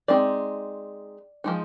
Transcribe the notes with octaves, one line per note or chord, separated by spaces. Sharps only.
G#3 C4 D#4 D5
F3 G#3 D#4